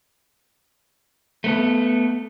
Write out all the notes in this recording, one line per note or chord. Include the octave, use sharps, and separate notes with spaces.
A3 B3 A4